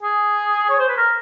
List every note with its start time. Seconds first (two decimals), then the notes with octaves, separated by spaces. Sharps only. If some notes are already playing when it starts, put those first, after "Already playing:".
0.02 G#4
0.70 C#5
0.79 C5
0.89 B4
0.97 A#4